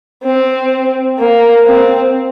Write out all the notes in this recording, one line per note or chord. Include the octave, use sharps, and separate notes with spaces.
C4
A#3
C4